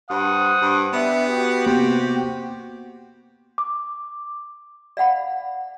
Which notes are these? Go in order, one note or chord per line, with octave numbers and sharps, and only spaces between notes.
G2 C5 F#5 D#6
G2
B3 D4 G4 E5
F#4 G4
C3 A#3 B3
D6
D5 F5 F#5 B5